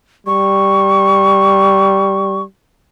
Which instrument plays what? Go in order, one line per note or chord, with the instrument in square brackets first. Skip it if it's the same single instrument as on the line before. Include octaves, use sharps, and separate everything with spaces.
[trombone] G3 [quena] C#6